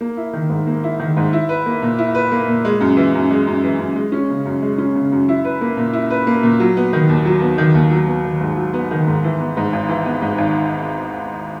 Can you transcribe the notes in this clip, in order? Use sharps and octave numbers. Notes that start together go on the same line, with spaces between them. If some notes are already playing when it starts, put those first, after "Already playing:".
A#3
E4
D#3
G#2
A#3
E4
D#3
G#2
E4
B4
A#3
A#2
E4
B4
A#3
A#2
G#3
F#2
E3
F#2
G#3
F#2
E3
F#2
G#3
C#4
C#3
F#2
G#3
C#4
C#3
F#2
E4
B4
A#3
A#2
E4
B4
A#3
A#2
F#3
B3
D#3
D#2
F#3
B3
D#3
D#2
F#3
B3
D#3
G#2
F#3
B3
D#3
G#2
E3
B3
G#2
G#1
E3
B3
G#2
G#1